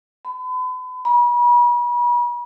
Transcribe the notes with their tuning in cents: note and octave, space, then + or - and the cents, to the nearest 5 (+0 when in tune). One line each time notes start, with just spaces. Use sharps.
B5 +40
B5 -40